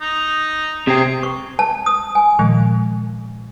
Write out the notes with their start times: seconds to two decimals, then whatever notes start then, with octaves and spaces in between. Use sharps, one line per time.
0.01 D#4
0.87 C3 C4 G#4
1.23 C#6
1.59 A5
1.86 D#6
2.15 G#5
2.39 A#2 D#3 F3 G#3